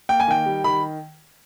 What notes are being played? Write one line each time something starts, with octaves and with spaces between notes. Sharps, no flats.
A#3 G5
G#5
D#3 G5
G3
D#3 B5